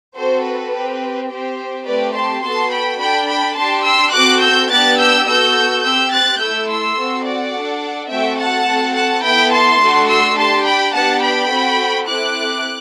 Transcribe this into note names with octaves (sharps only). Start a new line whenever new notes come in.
C4 F#4 A4 C5
B4
C4 G4
C4 G4 C5
A3 C4 G4 B4 D5
A5 C6
B3 F#4 A4 A5 C6
G5 B5
D4 A4 G5 B5
G5 B5
D4 G4 A5 C6
C6 E6
C4 F#4 A4 D6 F#6
E6 G6
B3 D4 G4 F#6 A6
E6 G6
B3 F#4 A4 E6 G6
C4 G4 E6 G6
F#6 A6
A3 E4 A4 E6 G6
C6 E6
C4 F#4 A4
D5 F#5
D4 A4
A3 C4 F#4 A4 E5 G5
F#5 A5
C4 F#4 A4
F#5 A5
B3 E4 A4 G5 B5
A5 C6
A3 D4 F#4 A4
C6 E6
D4 G4 A5 C6
G5 B5
B3 D4 G4 F#5 A5
G5 B5
C4 F#4 A4
C4 E4 A4 D6 F#6